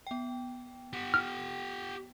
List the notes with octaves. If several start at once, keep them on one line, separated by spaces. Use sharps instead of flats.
B3 G5
G4 F#5
F6